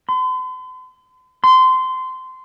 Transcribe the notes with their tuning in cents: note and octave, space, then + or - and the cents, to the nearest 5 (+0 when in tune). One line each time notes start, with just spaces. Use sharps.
C6 -45
C6 -20